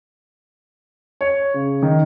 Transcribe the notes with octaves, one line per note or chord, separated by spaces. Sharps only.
C#5
C#3
D#3